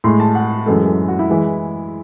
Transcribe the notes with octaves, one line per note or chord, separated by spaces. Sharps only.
A2 G#3 C6
A5
F#5
F#2 E3 G#3 A4
A4
F#4
E4
E3 G#3